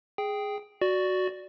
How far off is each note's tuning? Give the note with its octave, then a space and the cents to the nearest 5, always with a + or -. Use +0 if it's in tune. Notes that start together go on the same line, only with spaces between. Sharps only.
G#4 +0 G5 +0
F#4 +0 D5 +0